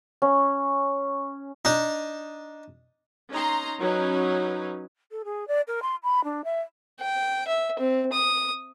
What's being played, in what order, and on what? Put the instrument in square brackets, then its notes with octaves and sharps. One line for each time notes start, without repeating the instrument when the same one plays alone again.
[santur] C#4
[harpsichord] D4 D#4
[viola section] C#4 D#4 A#5 C6
F#3 C#4 D#4 B4
[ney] A4
G#4
D5
A#4
C6
B5
D4
E5
[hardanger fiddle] G5
E5
C4
D#6